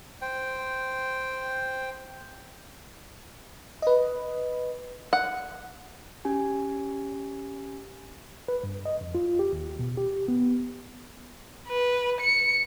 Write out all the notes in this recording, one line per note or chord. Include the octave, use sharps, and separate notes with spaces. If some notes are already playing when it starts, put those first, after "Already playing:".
C5 G5
B4 D#5
F#5
C#4 G4 G#5
B4
G2
D#5
F2
F4
G4
D#2
B2
G4
B3
B4
C#7